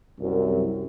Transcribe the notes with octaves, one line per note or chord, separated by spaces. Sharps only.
C2 F#2